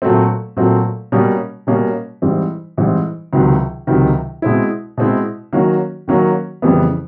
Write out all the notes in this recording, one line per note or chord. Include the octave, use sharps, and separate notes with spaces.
A#2 F#3 A3 C4
A#2 F#3 A3 C4
B2 G3 A#3 C#4
B2 G3 A#3 C#4
G#2 E3 G3 C4
G#2 E3 G3 C4
C#2 C3 D#3 F#3
C#2 C3 D#3 F#3
B2 G#3 C4 E4
B2 G#3 C4 E4
D#3 F#3 A#3 C#4 F#4
D#3 F#3 A#3 C#4 F#4
F2 C#3 E3 G3 B3